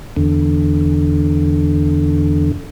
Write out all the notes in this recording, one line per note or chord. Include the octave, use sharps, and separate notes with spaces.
E2 D3